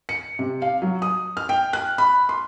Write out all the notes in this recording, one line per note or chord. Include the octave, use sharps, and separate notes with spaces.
C#7
C3
F5
F#3
D#6
F6
G5
F#6
B5
C6